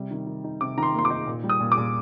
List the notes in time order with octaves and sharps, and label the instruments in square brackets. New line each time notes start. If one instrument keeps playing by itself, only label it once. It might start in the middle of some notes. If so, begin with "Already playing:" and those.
Already playing: [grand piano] C3 G3
D#3
D#3
D#4
C3 D6
D#3 A#5
C6
A#3 C6
D6
D#4
A#2
G3
D#6
A#2
D6
A#2